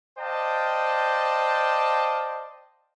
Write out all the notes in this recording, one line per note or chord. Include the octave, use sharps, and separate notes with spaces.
C5 D5 D#5 F5 G5 A5